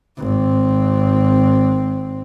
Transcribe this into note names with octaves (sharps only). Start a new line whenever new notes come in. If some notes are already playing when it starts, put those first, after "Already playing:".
G#1 C4